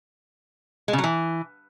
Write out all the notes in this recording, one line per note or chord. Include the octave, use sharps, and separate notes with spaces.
G#3
C#3
F#3
E3